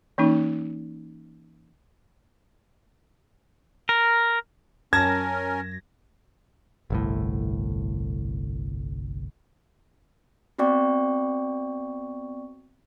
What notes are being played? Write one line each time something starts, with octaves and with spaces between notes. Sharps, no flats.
E3 A#3 C#4 D#4
A#4
F#2 C#4 A#4 A5 G#6 A#6
G1 C2 A2
B3 C4 F#4 D5 G5 C#6